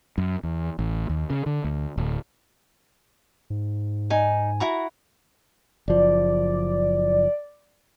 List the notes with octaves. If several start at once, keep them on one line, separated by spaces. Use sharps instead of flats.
F#2
E2
A1
D#2
C#3
D3
D2
D1
G#2
D#4 G#5
E4 F#4 A#5
F#1 F3 D5